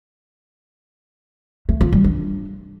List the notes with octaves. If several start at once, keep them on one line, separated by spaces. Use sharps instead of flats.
A3
F4
G3
D4